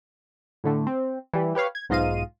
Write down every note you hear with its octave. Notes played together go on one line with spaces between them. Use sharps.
A2 D3 A3
C4
E3 G3
G4 B4 C#5 F5
G#6
B1 G#2 F4 D#5 F5 D#7